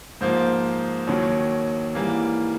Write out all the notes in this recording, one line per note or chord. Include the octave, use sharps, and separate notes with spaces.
G#2 F3 A#3 C5
D#2 D#3 F#3 C#5
G#2 E3 G3 A#3